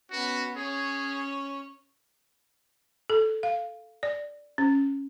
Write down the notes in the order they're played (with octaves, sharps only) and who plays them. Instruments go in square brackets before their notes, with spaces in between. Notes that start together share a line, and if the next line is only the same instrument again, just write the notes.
[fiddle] B3 C#4 [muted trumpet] F#4
[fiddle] C#4 C#5 [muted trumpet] G#4
[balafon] A4
F5
D5
C#4